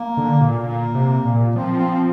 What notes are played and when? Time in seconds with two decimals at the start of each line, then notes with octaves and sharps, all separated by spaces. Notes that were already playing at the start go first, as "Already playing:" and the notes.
Already playing: A#3
0.17 D3
0.41 A#2
0.63 A#2 A#3
0.95 C3
1.25 A#2
1.56 F3 C4
1.79 C4